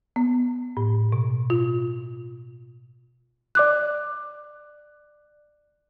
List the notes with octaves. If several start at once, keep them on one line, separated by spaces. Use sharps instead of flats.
B3
A2
B2
F4
D5 D6 F#6